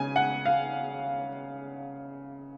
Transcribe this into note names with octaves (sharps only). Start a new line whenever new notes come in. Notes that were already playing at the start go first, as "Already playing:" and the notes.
Already playing: C#3 G#5
F#5
F5